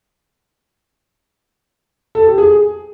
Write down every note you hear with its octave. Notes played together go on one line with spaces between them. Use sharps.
A4
G4
G#4